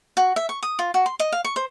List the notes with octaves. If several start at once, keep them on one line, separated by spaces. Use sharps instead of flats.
F#4
E5
C#6
D#6
F4
F#4
C6
D#5
F5
C#6
C5